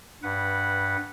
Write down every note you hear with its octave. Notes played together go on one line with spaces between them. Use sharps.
G2 B4 F#5